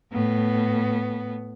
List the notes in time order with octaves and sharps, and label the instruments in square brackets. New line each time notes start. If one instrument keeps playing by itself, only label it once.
[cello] A2 B3